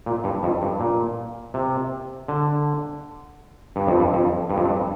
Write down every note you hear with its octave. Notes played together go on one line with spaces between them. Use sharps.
A#2
G2
F2
G2
A#2
C3
D3
G2
F2
G2
F2
G2
F2
G2